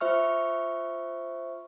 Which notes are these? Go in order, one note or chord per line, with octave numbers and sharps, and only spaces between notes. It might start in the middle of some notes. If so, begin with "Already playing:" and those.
F4 C5 E5 C#6 F6